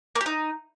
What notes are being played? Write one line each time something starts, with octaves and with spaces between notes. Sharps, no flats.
A#3
G4
D#4